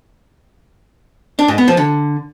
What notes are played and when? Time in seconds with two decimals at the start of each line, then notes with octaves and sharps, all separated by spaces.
1.39 D4
1.48 G#2
1.58 B3
1.68 F3
1.77 D3